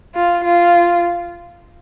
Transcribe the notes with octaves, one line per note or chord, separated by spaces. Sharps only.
F4
F4